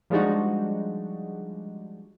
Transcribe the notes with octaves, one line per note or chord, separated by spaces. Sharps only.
F3 G3 G#3 D4 D#4 F#4